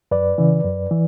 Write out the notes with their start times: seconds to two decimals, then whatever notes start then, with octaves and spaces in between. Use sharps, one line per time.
0.11 F#2 B4 D5
0.38 C#3 E3
0.64 F#2
0.91 E3